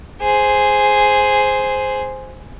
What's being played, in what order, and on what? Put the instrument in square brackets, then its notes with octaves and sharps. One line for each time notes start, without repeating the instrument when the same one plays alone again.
[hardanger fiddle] G#4 C5